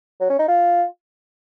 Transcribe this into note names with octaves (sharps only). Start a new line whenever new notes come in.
F#3
C#4
D#4
F4